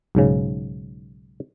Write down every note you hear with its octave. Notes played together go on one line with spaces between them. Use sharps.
B1 G#2 C#3